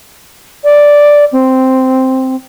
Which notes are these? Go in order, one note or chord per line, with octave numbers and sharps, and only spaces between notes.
D5
C4